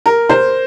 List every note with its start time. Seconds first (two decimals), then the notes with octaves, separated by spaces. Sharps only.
0.06 A#4
0.29 C5